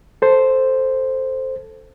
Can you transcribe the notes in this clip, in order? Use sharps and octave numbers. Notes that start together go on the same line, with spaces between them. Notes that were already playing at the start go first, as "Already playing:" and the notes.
A4 C5